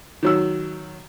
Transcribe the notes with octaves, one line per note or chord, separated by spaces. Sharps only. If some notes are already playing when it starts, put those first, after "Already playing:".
D#3 F#3 E6